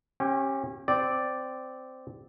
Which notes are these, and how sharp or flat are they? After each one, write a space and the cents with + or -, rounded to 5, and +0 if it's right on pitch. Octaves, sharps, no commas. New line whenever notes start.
C#4 -30 G4 +0
C4 -15 D5 +0